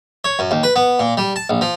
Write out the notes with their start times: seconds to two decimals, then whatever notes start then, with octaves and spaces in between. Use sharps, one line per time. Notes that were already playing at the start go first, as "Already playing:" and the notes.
0.24 C#5
0.39 F#2
0.51 D#2
0.63 B4
0.76 B3
0.99 A#2
1.17 G3
1.36 A5
1.50 A#1
1.61 F3